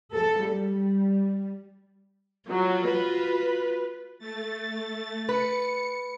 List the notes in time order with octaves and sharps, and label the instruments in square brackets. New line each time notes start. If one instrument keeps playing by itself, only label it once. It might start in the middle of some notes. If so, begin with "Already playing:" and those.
[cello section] A4
G3
[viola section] F#3 [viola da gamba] F4 F#4
[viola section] B4
[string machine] A3 A6
[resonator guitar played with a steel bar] B4 [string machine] C#7